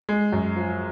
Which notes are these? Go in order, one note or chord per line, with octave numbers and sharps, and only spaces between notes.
G#3
F#2
F3